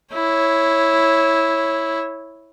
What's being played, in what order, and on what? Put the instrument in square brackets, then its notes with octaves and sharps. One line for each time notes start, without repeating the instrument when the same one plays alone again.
[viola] E4 C#5